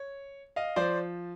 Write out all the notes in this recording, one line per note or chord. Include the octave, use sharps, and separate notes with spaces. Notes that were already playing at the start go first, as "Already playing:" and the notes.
Already playing: C#5
D#5 F5
F3 C5 D5